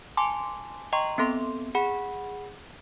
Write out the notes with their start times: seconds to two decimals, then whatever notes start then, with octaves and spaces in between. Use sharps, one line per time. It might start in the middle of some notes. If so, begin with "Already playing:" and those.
0.17 G#5 A5 C6 D6
0.93 D#5 G5 A#5 C6 C#6
1.18 B3 C4 A4 C6
1.75 G#4 F#5 B5